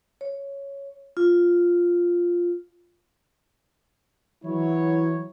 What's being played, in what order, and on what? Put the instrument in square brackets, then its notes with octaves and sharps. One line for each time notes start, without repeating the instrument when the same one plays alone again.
[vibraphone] C#5
F4
[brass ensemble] E3 F#3 E4 C#5